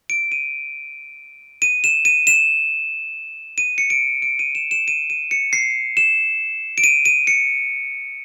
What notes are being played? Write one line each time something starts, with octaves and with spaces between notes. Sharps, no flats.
D7
D#7
D#7
E7
D#7
E7
D#7
C#7
D7
D7
D#7
E7
E7
D#7
D#7
C#7
C7
E7
D7
D#7
D#7
C#7